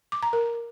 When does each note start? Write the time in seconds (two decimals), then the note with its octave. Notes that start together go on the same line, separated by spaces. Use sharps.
0.12 D6
0.23 A#5
0.33 A#4